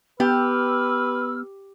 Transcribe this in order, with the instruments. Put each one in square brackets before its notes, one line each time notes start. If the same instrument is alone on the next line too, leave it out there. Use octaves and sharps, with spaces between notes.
[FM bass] B3 [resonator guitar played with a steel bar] G4 [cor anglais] B4 [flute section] E6 F6